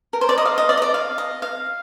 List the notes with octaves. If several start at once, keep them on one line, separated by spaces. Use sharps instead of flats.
A#4
C5
D5
D#5
F5
D#5
D5
D#5
D5
F5
D#5
F5